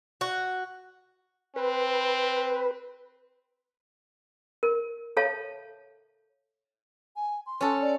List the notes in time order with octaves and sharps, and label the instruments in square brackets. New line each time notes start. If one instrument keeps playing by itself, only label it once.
[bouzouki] F#4
[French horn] C4 [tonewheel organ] B4
[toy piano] A#4
A4 C#5 E5 F5 A5
[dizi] G#5
C6
[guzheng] C#4 A4 F#5
[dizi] D5